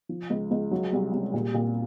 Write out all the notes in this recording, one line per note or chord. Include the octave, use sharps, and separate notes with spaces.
F3
C#2
C#2
F#3
C2
C2
A#2
A#2